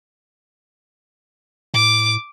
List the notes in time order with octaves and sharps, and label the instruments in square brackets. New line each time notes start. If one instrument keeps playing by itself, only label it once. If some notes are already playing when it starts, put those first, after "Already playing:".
[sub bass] A2 [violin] D6